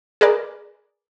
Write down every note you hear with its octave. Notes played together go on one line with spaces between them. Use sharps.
G#4 A#4 B4 D5